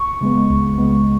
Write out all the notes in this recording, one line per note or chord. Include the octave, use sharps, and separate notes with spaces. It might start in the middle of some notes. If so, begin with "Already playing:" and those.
Already playing: C#6
C#3 G#3 B3
C#2
C#3 G#3 B3